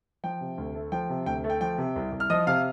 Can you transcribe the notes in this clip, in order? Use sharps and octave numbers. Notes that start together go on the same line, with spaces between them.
F3 G5
C3
D2
A3
F3 G5
C3
D2 G5
A3
G5
F3 G5
C3
C2
C2
F6
F3 D#5 D#6
C3 F5 F6